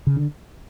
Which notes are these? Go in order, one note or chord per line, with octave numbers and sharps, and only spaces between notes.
C#3
D3